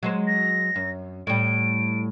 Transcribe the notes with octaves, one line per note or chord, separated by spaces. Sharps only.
F#3 G#3 C5
A#6
F#2
A2 G3 D7